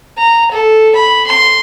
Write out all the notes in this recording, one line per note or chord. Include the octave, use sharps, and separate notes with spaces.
A#5
A4
B5
C6